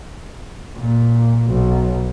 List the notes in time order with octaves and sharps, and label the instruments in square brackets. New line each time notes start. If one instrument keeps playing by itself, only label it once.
[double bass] A#2
B1